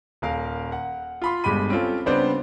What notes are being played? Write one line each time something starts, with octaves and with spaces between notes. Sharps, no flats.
D#1 A#4 F5 F6
F#5
F4 B5 C6
G1 G2 G#3 G4 B5 D#7
C4 C#4 F4 A4
C#3 G3 B3 C4 D4 C5